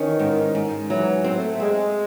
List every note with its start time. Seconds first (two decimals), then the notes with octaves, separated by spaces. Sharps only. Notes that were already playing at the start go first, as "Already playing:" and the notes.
Already playing: D#3 E3 C#4
0.19 G#2
0.55 G#2
0.89 E3 F#3
1.24 C4
1.37 A3
1.60 G#3 C4